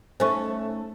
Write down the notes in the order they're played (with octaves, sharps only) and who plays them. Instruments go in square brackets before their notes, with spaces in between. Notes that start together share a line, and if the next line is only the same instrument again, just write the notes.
[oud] A3 C#4 [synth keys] D#4 A4 A5 [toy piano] C5 D#5 C#6